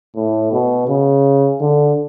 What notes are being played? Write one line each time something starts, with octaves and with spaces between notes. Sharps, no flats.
A2
B2
C#3
D3